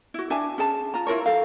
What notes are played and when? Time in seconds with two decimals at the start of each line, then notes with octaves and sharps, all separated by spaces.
0.14 E4 F#4
0.30 D4 E5 G#5 A5
0.58 C#4 G#4 A5
0.94 F4 A#5
1.07 E4 F4 A#4 C#5
1.26 A4 F5